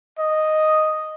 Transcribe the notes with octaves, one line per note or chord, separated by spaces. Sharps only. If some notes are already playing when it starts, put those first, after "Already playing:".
D#5